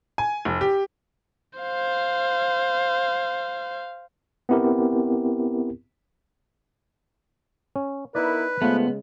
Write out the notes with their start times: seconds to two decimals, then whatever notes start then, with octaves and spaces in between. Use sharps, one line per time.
0.18 G#5
0.45 F1
0.61 G4
1.59 C5 F5
4.49 B3 C4 E4 G4 A#4
7.76 C#4
8.15 B3 D#4 E4 A#4 B4 D5
8.62 C#3 G#3 A3 B3 F4 C5